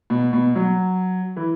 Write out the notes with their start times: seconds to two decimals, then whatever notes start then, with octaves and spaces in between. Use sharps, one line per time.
0.10 B2
0.33 B2
0.55 F#3
1.36 E3